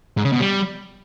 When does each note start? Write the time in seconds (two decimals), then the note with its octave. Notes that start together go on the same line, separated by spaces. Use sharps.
0.17 G#2
0.25 C#3
0.32 B2
0.40 G3